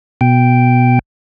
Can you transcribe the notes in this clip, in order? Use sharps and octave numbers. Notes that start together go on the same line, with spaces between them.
B2 G5